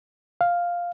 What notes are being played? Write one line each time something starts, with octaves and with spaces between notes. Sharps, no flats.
F5